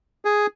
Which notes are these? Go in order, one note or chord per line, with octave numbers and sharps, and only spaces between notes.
G#4